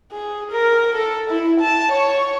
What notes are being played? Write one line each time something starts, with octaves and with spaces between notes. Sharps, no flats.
G#4
A#4
A4
E4
A5
C#5